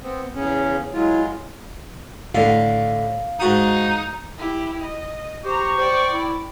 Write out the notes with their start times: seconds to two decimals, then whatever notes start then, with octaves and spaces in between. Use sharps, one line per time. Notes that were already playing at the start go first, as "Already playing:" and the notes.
0.01 B3 C4
0.34 E2 C#3 C#4
0.94 F#3 G#3 E4 F4
2.35 A2 D3 F5
3.40 G#2 D#4 F#4 D#6
4.38 E4 G4
4.82 D#5
5.45 G4 C5 A#5 C#6
5.78 C5 D5 G5
6.13 E4